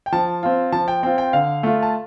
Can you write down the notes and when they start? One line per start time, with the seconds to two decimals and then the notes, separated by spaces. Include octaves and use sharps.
0.06 G5
0.12 F3 A5
0.43 C4 F4
0.72 F3 A5
0.88 G5
1.03 C4 F4 G5
1.18 G5
1.33 D3 F5
1.63 A3 F4
1.83 A5